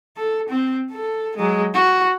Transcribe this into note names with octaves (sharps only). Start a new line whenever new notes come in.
A4
C4
A4
F#3 G#3
F#4